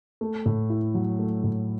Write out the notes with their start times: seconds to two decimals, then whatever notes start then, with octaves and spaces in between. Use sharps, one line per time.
0.21 A3
0.46 A2
0.70 E4
0.94 F#3
1.19 A3
1.44 A2